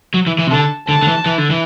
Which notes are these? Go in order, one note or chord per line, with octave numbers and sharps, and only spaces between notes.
F#3
E3
E3
C3
D3 A5
D3 A5
D3
E3
E3
D3
E3